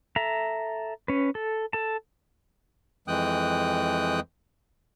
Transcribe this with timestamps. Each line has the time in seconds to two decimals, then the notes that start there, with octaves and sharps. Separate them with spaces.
0.16 A4 E5 A#5
1.08 C#4 B4
1.35 A4
1.73 A4 A5
3.08 F2 E3 G#3 G5 D#6 F#6